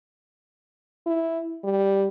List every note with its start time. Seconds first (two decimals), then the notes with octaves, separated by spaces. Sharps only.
1.07 E4
1.64 G3